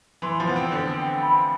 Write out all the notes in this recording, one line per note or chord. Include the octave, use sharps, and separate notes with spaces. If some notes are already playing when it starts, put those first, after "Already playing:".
E3 C6
F3
B3 C5
C4
D3 C5
G5
B5